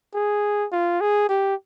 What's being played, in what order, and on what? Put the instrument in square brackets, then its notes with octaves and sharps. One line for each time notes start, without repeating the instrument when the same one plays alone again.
[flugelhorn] G#4
F4
G#4
G4